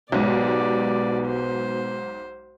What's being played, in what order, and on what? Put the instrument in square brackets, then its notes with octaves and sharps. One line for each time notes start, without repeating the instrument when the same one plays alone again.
[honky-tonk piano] B1 G#2 [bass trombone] B2 [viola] G4 D5
[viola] C5